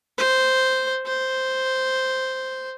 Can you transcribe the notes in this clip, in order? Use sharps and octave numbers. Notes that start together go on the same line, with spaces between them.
C5
C5